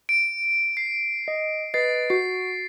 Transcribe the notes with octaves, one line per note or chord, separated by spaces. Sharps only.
D7
C7
D#5
B4 D#5 A6 C7
F#4 C7